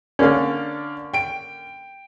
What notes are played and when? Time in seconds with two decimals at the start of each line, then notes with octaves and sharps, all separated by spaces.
0.19 D3 A#3 C#4 D4 D5 F5
1.14 G5 D7